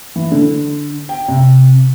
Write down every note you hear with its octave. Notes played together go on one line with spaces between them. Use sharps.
E3
D3
G5
C3